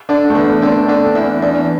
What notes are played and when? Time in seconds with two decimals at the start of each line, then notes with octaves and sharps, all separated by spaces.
0.09 D3 D4
0.30 A3
0.35 E2 B3
0.62 D3 C4
0.88 D3 D4
1.15 E2 E4
1.42 E2 D4